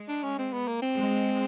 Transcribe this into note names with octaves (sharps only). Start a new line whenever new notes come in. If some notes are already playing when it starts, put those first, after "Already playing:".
Already playing: G#3
D4
C#4
C4
B3
A#3
C4
G#3